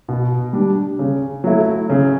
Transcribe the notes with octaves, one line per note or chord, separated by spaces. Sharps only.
B2
G3 D4
C#3
F#3 A3 E4
C#3